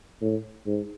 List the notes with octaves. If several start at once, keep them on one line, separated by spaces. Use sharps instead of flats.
A2
G#2